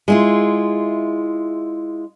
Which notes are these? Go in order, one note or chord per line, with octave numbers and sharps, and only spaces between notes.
G#3 E4 F4